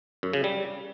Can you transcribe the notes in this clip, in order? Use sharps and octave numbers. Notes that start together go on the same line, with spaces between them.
F#2
C#3
G3